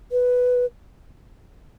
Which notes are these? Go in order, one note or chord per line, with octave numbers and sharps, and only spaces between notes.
B4